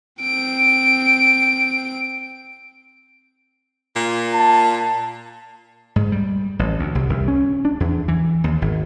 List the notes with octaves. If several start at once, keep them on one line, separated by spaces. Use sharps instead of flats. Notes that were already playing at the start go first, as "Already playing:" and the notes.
C4 D7
A#2
A5
G#2
G3
A1
D2
C2
C2
C#4
D4
E2
E3
D#2
G#1